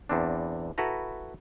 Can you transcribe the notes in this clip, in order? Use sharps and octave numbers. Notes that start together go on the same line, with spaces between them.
E2 C4 D4
E4 F#4 A4 B4 A#5